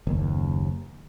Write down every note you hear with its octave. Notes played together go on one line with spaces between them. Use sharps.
F#1 D#2